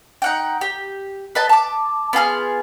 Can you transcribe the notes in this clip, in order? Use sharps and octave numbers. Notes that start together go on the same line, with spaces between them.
D#4 F#5 G5
G4
B4 D#5 A5
A5 D6
B3 F4 G#4 F6